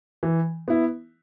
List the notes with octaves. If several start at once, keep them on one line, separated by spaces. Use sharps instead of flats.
E3
B3 E4